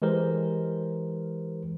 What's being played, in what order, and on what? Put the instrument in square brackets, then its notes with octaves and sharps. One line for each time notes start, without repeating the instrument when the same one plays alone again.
[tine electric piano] E3 G#3 G4 A#4 C5